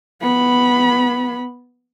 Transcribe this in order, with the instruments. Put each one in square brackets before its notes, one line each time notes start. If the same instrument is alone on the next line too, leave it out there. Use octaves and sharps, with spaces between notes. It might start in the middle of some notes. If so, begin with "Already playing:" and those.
[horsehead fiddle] B3 B5